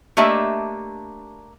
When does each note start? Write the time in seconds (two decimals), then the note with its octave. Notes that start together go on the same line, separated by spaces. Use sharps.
0.17 A3 A#3 D4 G4 D#5 E5